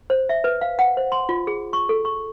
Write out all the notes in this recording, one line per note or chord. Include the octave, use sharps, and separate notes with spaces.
C5
E5
B4
F5
F#5
C5
C6
F4
G#4
C#6
A4
C#6